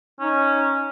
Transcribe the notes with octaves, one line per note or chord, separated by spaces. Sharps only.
C#4 D#4